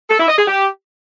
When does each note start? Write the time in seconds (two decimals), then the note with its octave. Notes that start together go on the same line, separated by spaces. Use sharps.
0.10 A4
0.19 E4
0.28 D#5
0.37 G#4
0.46 G4